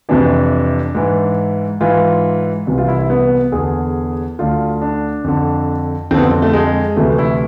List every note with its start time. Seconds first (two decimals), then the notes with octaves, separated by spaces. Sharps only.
0.09 F2 C3 E3 D4
0.95 G#2 E3
1.81 G#2 E3 F4
2.67 C2 C3 E3
2.78 F4
2.88 E4
2.99 E4
3.10 B3
3.52 E2 D3 G#4
4.39 D2 D3 F4
4.81 D4
5.24 F2 D3
6.11 F2 D3 C4
6.17 B3
6.22 C4
6.42 A3
6.53 G#3
6.96 D2 C3 E3 A3
7.18 E4